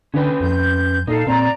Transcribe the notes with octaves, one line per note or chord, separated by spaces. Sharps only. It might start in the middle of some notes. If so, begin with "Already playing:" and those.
D3 C#4 B4 G5
F2 G6
A#2 D#4 A4 F5
A#2 C4 D5 A#5